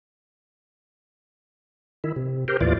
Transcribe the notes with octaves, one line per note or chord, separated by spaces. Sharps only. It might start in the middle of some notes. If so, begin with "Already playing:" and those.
D#3 E4
C3
G4 A#4 C5
D#2 A2 E3 F4 D5